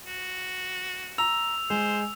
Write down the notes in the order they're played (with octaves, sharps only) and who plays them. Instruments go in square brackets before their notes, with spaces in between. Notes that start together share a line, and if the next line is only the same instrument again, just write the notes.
[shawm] F#4
[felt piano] A#5 [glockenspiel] E6 F7
[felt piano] G#3 [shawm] C5